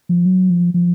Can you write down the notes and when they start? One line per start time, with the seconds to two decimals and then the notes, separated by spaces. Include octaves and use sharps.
0.09 F3
0.26 F#3
0.50 F3
0.74 F3